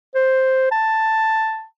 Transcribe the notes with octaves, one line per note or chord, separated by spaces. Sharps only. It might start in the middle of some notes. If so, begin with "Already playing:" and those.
C5
A5